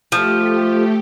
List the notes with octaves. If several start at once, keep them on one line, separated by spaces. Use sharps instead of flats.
F3 A3 G4